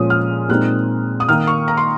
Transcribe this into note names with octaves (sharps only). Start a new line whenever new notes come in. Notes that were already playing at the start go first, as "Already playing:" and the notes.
Already playing: A#2 F3 G#3 C#4 D#6
F6
A#2 G#3 C4 D#4 F#6
D#6
D#3 A#3 D#4 F6
C#6
A#5
C6